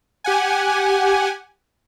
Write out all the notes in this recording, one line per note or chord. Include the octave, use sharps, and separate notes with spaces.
G4 F#5 G#5